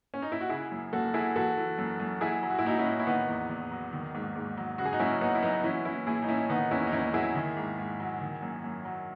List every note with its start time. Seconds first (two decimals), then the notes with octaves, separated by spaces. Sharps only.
0.14 C#4
0.22 D#4
0.32 E4
0.41 F#4
0.49 C#3 E4 G#4
0.72 F#2
0.93 F#2 F#4 A4
1.14 F#3 E4 G#4
1.36 E3 F#4 A4
1.57 E3
1.78 F#2
2.00 F#2
2.21 F#3 E4 G#4
2.43 F#3
2.50 F#4
2.59 E4
2.65 A2 D#4 F#4
2.78 C#4 E4
2.85 A2
2.99 E4
3.07 D#3 B3 D#4
3.29 E2
3.50 E2
3.71 F#3
3.93 D#3
4.14 G#2
4.35 G#2
4.57 F#3
4.78 C#3 F#4
4.85 G#4
4.93 D#4 F#4
5.00 F#2 C#4 E4
5.21 F#2 B3 D#4
5.35 E4
5.42 F#3 B3 D#4
5.64 E3 C#4 E4
5.85 E3 C#4 E4
6.07 A2 E4 G#4
6.22 D#4
6.28 A2 C#4 E4
6.50 D#3 B3 D#4
6.71 E2 C#4 E4
6.87 D#4
6.92 E2 C#4 E4
7.14 F#3 E4 G#4
7.35 D#3
7.56 G#2
7.79 G#2
8.00 F#3
8.21 D#3
8.42 F#2
8.64 F#2
8.85 F#3